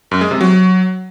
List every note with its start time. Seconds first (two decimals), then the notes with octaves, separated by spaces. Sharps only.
0.11 F#2
0.21 G#3
0.31 C3
0.41 F#3